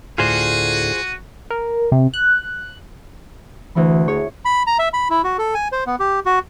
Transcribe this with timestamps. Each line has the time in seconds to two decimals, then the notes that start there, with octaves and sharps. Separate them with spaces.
0.18 D2 A2 F4 F#4 G#4 C5 D5 D#7
1.50 A#4
1.92 C3
2.14 F#6
3.75 D2 E3 E4 B5
4.08 G#4 C#5
4.45 B5
4.67 A#5
4.79 E5
4.93 B5
5.10 E4
5.24 F#4
5.38 A4
5.54 G#5
5.72 C5
5.87 B3
6.00 G4
6.26 F#4